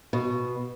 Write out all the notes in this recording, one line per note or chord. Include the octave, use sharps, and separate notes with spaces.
B2